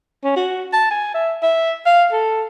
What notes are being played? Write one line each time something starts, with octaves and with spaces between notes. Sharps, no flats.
C#4
F#4
A5
G#5
E5
E5
F5
A4